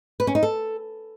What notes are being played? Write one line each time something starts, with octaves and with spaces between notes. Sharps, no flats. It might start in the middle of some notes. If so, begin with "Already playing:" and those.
B4
C#4
D#4
A4